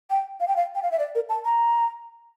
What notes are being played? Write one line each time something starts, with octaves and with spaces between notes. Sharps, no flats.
G5
F5
G5
F5
G5
F5
E5
D5
A#4
A5
A#5